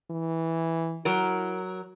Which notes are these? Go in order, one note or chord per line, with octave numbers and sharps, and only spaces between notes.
E3
F#3 E4 A#4